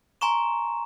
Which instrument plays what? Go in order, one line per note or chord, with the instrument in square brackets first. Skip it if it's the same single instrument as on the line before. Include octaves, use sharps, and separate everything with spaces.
[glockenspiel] G#5 A#5 C6 C#6 E7